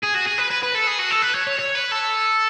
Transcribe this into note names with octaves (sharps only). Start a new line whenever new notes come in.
G#4
F#4
G#4
B4
B4
B4
A4
G#4
F#4
A4
B4
C#5
C#5
C#5
B4
A4